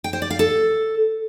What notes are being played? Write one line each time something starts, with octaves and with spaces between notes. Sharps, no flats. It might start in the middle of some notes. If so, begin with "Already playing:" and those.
G5
C5
D5
F5
A4